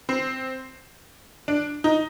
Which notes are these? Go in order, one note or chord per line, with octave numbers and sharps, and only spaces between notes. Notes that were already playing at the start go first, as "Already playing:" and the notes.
C4
D4
D#4